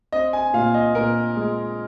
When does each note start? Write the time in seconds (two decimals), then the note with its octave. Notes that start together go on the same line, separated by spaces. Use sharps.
0.12 C4 D#5
0.33 G#5
0.53 A#2 F5
0.74 D#5
0.95 A#2 A#4
1.36 G#3